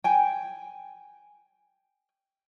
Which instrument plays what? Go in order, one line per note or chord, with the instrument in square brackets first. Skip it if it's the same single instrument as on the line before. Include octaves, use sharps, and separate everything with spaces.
[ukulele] G5 G#5